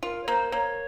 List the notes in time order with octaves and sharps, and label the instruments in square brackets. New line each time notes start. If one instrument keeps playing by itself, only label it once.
[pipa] F4 [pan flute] A#4
[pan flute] C#5
[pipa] A#3 [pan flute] C5
[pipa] A#3 [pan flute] C#5